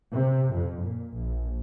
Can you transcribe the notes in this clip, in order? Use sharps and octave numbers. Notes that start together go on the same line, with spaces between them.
C3
F2
A#2
A#1